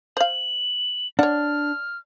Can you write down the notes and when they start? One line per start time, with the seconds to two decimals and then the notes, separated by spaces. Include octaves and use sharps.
0.17 C5 F5 F#7
1.19 D4 C#5 F#5 F6